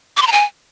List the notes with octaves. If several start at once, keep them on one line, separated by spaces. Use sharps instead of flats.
D6
C6
A#5
G#5